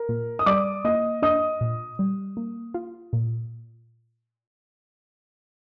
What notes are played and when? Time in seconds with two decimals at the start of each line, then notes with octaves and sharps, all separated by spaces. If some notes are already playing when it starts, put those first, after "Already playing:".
Already playing: A#4
0.09 A#2
0.39 D#6
0.46 G3 D5 D6
0.84 A#3 D#5 D#6
1.22 D4 D#5 D#6
1.61 A#2
1.99 G3
2.37 A#3
2.74 F4
3.13 A#2